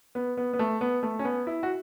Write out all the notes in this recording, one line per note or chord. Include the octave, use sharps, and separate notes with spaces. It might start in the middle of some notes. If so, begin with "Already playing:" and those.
B3
B3
B3
A3
B3
A3
C#4
B3
E4
F#4